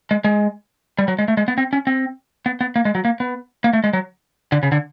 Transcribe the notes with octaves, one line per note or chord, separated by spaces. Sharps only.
G#3
G#3
G3
F#3
G#3
A3
G#3
B3
C4
C#4
C4
B3
B3
A#3
G#3
F#3
A#3
B3
A#3
A3
G#3
F#3
D3
C#3
D3